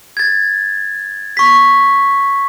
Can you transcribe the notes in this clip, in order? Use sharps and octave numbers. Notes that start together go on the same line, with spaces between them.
G#6 A6
C#6 B6